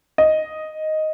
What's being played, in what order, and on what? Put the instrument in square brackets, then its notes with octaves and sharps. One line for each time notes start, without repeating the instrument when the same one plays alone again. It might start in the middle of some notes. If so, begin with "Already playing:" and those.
[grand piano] D#5